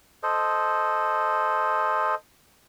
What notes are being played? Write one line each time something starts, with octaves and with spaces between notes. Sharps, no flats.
A4 C5 D#5